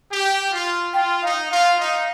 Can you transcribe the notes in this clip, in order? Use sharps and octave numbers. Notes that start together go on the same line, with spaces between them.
G4
F4
F4 G5
D#4 F5
F4 F5
D#4